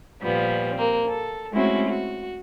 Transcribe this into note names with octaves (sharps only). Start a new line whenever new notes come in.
A#2 F3 G3 B3
A#3 C4
A4
G#3 A3 C4 C#4 E4 F#4
F#4